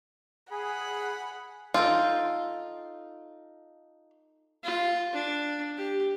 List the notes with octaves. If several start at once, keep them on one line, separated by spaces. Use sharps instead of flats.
G#4 F#5 B5
D#4 F4 A4 G5
F4
D4
G4